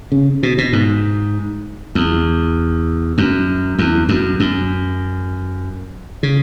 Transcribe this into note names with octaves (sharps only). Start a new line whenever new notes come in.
C#3
B2
B2
G#2
E2
F#2
E2
F#2
F#2
C#3